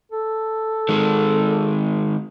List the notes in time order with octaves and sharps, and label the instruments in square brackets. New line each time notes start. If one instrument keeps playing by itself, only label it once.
[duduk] A4
[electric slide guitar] D#3 G#3